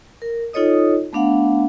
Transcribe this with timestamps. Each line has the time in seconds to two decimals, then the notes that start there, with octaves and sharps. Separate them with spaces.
0.22 A#4
0.53 D#4 F4 A4 C#5 D#5 D#6
1.13 A3 B3 D4 F5 F#5